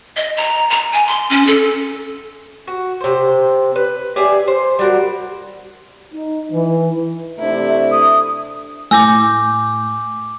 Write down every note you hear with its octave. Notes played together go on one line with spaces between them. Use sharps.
D#5
A#5
A#5
G#5
C6
C#4
A4
F#4
C3 C5
B4
G4 G#4 D5 E5
C5
G3 F#4 A#4
D#4
E3
C3 A3 D4 E4
D#6
A2 G#5 D6 E6 G6 A#6